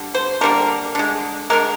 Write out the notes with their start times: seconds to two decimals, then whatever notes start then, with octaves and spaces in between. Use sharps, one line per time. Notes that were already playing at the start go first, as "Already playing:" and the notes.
Already playing: D3 G3
0.14 C5
0.41 D3 G3 A#3 A#4
0.95 D3 G#3
1.50 G#3 A#4
1.53 D3